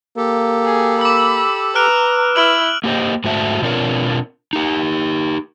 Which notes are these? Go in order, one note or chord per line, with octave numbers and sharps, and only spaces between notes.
A#3 G4 A4
G#4
B5 D6 E6
B4 A#5 F6 F#6 D7
E4 F6 D7 F#7
A#3 G4 C5 D#5
G#2 A3 F#4 C5 E5 A5
B2 C4 D4 F4 A#4 C#5
D#4 G4